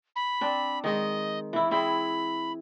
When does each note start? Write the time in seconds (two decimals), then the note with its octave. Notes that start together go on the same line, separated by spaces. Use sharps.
0.16 B5
0.41 C4 D4
0.84 D#3 G#3 D#5
1.53 E3 E4
1.71 C4 E4 G#4 B5